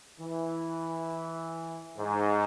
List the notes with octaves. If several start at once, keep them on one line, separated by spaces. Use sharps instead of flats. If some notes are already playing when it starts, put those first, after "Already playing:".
E3
G#2